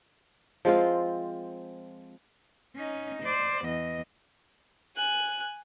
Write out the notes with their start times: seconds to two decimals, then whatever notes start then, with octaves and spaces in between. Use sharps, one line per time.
0.65 F3 G#3 C4 F4
2.77 C#4 D#4
3.23 C5 D5
3.66 E2 D#5
4.96 G#5 F#6